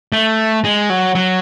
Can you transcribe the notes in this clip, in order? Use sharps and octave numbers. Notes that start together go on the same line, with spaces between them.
A3
G#3
F#3
F#3